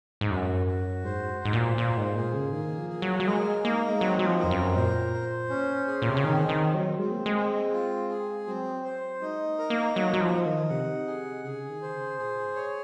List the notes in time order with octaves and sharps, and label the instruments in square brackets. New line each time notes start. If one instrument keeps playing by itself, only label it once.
[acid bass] G#2
[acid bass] F#2 [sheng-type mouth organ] F#4
[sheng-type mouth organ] F#4
[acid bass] G#2 [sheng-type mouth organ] C5
[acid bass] G#2 [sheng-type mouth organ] C5
[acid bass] A#2
[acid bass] A#2 [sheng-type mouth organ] A#3
[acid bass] G#2
[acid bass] A#2 [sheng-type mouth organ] G#4
[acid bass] C#3
[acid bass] D#3 [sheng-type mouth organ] A#3
[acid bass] F3
[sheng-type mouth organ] G#4
[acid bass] F#3
F#3
[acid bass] G#3 [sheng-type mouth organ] A#4
[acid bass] A#3 [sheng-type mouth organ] D#4
[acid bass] G#3
[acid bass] F#3 [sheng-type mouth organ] C4
[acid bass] F#3
F3
[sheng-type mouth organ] A#4
[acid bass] F2
F#2
[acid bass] A#2 [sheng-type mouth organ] C5
[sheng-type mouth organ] C5
C#4
G#4
[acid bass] A#2
C3
C#3
[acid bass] D#3 [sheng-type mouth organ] C4
[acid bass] D#3
[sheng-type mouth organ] C4
[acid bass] F#3
[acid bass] G#3 [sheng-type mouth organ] C4
[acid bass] A#3
G#3
[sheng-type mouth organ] C4
F4
G#4
[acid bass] F#3 [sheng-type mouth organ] C4
[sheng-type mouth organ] C5
[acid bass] G#3 [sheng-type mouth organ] D#4
[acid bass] A#3
[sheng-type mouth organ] A#4
[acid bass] A#3
[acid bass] F#3 [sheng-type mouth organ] D#4
[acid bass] F#3
F3
[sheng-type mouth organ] D#4
[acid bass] D#3
[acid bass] C3 [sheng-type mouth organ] F#5
[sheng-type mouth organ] G#4
[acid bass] C#3 [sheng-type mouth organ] G#4
[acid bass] D#3
[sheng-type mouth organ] C5
[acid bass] C#3
[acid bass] A#2 [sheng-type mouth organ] G#4
[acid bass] G#2
[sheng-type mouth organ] C#5